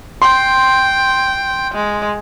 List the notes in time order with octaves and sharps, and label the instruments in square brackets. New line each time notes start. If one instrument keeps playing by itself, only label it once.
[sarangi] G5 [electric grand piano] C6
[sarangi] G#3